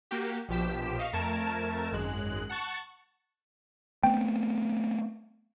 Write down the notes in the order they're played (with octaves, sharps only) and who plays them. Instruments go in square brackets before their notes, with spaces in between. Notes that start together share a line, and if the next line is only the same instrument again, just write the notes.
[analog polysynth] A#3 F#4 G4
A#1 B2 F3 G4 B6 E7
D#5 F5 C#6
F2 A3 A#4 A5 G#6 E7
G#1 F#2 G#3 F#6
F#5 A5 C#6
[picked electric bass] A3 B3 C4 [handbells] G5